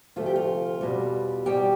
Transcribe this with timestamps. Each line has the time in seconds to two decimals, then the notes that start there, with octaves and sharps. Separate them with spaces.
0.16 D2 C3 F3 A3 F4
0.26 G4
0.36 F4
0.81 E2 B2 G3
1.46 E2 B2 G3 G4